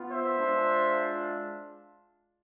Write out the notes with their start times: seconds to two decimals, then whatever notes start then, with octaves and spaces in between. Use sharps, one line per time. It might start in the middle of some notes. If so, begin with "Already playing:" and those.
Already playing: B3 F4
0.10 C5 E5
0.39 G#3 D4 F4